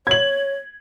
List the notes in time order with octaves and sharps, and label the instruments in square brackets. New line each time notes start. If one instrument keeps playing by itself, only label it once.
[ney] C#5 [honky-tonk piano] G#6 F#7